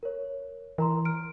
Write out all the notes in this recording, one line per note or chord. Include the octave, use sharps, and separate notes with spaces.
A#4 C#5
E3 A#4 A#5 C6
F6 D7